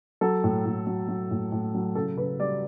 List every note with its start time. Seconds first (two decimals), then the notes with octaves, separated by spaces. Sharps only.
0.21 F#3 A4
0.44 A2
0.66 A2
0.87 F#3
1.08 F#3
1.31 A2
1.52 A2
1.74 F#3
1.95 C#3 A4
2.17 C#3 B4
2.39 G3 D5